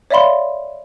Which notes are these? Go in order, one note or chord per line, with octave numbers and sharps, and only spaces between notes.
C#5 D5 E5 F5 B5 C6